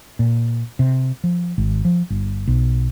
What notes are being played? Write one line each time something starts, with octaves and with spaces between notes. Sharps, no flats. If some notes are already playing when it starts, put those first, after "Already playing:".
A#2
C3
F3
G#1
F3
G1
B1